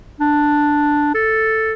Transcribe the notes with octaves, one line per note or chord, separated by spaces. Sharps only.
D4
A4